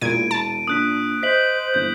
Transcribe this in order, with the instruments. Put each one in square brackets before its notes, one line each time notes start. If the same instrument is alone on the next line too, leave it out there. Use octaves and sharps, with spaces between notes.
[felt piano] E1 E4 [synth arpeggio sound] A#2 G#6 [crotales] D7 D#7
[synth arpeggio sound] A5
[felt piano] A#2 D4 [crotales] D#6 F#6 B6
[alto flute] C5 [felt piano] D#5 [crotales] B6 F#7
[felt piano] G1 E3 [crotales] G6